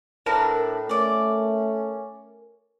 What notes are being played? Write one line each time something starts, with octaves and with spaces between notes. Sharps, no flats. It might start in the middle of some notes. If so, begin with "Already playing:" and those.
A2 D4 A#4 B4 E5
A3 C#4 D5 D6